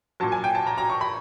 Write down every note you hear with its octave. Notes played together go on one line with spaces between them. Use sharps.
A#2 F#3 A5
G#5
G5
A5
A#5
A#5
C#6
B5